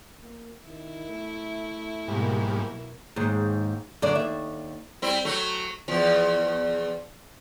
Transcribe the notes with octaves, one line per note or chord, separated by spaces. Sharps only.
A#3
D#3 E4
A3
G#2 B2 F#3 G3 A#3
D#2 G#2
F#2 D3 D5
D#2 E5
G3 C4 E4
F#3 A3
E2 F3